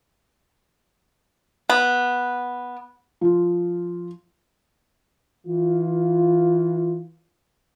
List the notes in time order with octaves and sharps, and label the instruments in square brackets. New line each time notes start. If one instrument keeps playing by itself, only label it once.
[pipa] B3
[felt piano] F3 F4
[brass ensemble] E3 F4